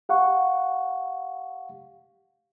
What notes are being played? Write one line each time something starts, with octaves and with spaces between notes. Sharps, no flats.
G4 F5 F#5 C#6